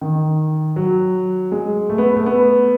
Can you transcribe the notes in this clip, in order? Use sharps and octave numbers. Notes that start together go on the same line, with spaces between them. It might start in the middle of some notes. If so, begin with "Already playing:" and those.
D#3
F#3
G#3
A3
B3
A3
B3